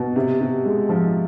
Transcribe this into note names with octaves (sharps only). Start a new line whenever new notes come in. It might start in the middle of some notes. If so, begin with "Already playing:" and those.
Already playing: B2
C3
C3
G#3
F3